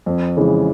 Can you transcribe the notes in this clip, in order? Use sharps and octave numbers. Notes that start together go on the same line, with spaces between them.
F2
C#3 E3 G#3